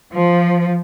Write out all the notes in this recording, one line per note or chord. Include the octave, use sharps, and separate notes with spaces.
F3